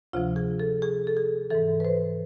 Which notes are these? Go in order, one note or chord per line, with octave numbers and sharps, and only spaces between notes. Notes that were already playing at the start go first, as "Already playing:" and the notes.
D2 C3 F3 F4
G#4
A4
G#4
A4
G#4
G#2 E3 A4
B4
C5